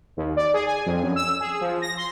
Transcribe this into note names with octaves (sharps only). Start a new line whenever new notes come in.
D#2
D5
G#4
G#5
F2
F#2
E6
G#4
F3
A#6
C6